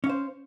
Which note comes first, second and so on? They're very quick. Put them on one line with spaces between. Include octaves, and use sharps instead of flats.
C#4 F5 C5